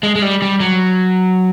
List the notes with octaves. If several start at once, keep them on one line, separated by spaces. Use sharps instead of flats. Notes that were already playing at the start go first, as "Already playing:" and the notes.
G#3
G#3
G3
G3
F#3